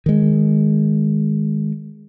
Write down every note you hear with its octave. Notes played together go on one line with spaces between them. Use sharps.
D#3 G#3